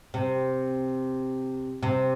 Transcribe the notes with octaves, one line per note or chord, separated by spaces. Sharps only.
C3
C3